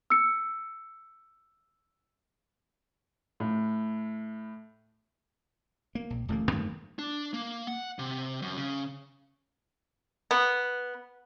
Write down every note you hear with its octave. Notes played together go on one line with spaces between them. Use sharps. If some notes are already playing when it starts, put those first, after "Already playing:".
E6 C#7
A2
A#3
A#1
D1 A1 A3 A#3
F#2 D#3 A3 A#3
D4
A#3
F#5
C3
F#2
C#3
B3